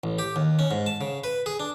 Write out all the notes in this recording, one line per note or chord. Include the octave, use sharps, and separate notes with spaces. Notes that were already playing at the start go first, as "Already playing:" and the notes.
A1
G4
D#2
C#4
G#2
A5
C#3
B4
G#4
D4